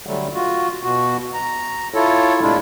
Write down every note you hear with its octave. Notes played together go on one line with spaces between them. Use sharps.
D3 F#3 G3 A3
F4 F#4
B2 F#4
A#5
E4 F4 A4 C#5
A2 C3 G#3 D4 E4 F4